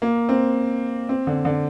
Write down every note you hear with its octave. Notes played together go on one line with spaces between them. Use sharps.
A#3
C4
C4
D3
D3